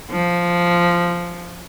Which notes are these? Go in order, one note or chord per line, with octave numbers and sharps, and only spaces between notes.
F3